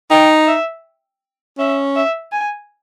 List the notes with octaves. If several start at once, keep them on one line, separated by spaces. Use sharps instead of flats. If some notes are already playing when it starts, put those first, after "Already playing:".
D#4 G5
E5
C#4 E5
E5
G#5